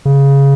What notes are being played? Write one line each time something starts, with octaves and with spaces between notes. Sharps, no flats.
C#3